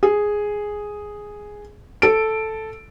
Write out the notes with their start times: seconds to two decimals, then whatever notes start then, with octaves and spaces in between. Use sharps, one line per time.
0.03 G#4
2.02 A4 D7